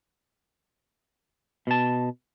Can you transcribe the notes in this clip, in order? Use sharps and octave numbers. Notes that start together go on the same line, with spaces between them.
B2 A5